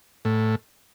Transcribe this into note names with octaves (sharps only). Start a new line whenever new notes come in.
A2